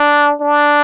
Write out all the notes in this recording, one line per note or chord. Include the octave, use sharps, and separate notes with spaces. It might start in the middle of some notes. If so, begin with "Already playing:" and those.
Already playing: D4
D4